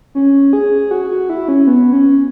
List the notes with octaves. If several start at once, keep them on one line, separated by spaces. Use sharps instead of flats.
C#4
G#4
F#4
F#4
E4
C#4
B3
C#4